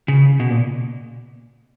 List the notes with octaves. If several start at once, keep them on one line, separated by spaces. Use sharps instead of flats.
C#3
B2
A#2